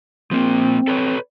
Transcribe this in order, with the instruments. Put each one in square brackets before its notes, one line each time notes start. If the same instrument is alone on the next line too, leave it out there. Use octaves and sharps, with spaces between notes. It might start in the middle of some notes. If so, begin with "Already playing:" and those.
[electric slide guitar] F3 A#3 [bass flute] C4
[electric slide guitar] A4 B4 C#5